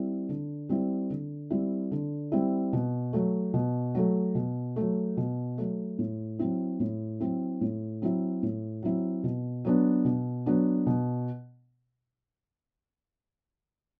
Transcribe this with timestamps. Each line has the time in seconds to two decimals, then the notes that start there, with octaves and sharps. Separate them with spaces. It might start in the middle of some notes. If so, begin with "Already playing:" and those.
Already playing: G3 C4 E4
0.29 D3
0.69 G3 C4 E4
1.10 D3
1.50 G3 C4 E4
1.91 D3
2.32 G3 C4 E4
2.73 B2
3.13 F#3 A3
3.54 B2
3.95 F#3 A3
4.35 B2
4.76 F#3 A3
5.17 B2
5.58 F#3 A3
5.99 A2
6.39 F#3 C4 E4
6.80 A2
7.20 F#3 C4 E4
7.61 A2
8.02 F#3 C4 E4
8.43 A2
8.83 F#3 C4 E4
9.24 B2
9.65 F#3 B3 D4
10.05 B2
10.46 F#3 B3 D4
10.86 B2